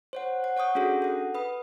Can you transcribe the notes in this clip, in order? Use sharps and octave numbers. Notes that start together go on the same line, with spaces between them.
C5 C#5 F#5
F#5
C#5 F#5 C#6 D#6 G6
C#4 D4 F#4 G#4 A4
A4 F#5
B4 B5 D#6